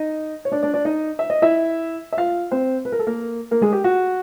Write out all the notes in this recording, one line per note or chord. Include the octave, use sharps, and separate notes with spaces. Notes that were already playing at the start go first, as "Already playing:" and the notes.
Already playing: D#4 D#5
C#5
D4 D5
D4 D5
D4 D5
D#4 D#5
E5
D#5
E4 E5
E5
F4 F5
C4 C5
B4
A#4
A4
A#3 A#4
A#3 A#4
G#3 G#4
G4
F#4